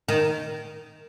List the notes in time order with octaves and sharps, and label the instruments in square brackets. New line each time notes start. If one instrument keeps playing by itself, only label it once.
[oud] D#3